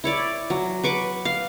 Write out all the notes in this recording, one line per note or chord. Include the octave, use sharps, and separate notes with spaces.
E4 C#5 D5
F#3
B4 C#6 D6
F5